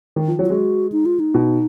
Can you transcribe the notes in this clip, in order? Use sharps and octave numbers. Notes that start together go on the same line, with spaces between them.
D#3
F3
F#3
F4
G#3 F#4
D#4
F4
D#4
B2